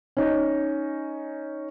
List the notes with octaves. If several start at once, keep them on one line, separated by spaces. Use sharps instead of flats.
C#4 D#4